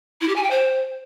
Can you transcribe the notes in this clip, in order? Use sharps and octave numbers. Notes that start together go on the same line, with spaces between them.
E4
G4
G#5
G5
C5